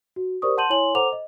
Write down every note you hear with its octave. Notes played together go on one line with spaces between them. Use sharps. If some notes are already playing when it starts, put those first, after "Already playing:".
F#4
G4 A#4 C5 D5 C#6 D#6
F#5 A5 C6 G6 D#7 F#7
E4 C#5 G#5 C6 F#7
A4 C5 F#5 A#5 D6 F7
D#5